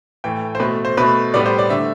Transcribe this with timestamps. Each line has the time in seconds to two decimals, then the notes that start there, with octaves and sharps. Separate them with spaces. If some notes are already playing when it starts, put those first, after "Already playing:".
0.24 A2 E3 A3 G5
0.55 C5
0.60 B2 A3 B4
0.85 C5
0.97 B2 A3 B4
1.34 A2 G3 B3 D5
1.46 C5
1.59 D5
1.70 D3 A3 E5